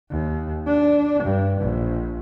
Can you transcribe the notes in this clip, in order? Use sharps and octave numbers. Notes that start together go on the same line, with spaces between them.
D#2
D4
G2
A#1